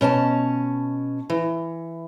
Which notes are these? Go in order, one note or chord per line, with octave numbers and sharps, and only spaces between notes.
B2 C#4 G#5 A5
E3